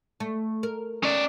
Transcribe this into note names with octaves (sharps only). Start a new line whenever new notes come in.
A3
A#4
C#4 D5